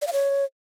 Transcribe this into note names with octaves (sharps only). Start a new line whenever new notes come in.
D5
F5
C#5